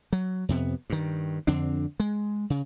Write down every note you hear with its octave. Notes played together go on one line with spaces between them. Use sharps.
F#3
F2 C3 B3
G2 D#3
F2 D3 C4 D4
G#3
C#3